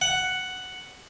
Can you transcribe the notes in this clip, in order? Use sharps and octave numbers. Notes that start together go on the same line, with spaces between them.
F#5